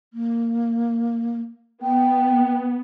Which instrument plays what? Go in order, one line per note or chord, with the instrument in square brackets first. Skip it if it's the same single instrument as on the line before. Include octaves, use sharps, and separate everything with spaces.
[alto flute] A#3
[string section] B3 [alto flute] G5